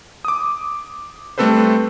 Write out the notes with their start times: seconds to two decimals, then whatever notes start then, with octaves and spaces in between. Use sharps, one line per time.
0.25 D6 D#6
1.38 G3 A3 C4 A4 B4 C5